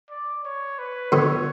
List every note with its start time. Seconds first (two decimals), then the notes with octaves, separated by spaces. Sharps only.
0.10 D5
0.45 C#5
0.78 B4
1.12 B2 D3 C#5